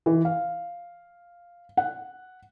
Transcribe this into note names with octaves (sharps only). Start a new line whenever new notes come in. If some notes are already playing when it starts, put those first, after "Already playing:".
E3
F5
F#5